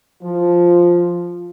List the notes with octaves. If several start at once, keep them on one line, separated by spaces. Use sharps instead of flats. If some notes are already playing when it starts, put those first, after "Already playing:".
F3 F4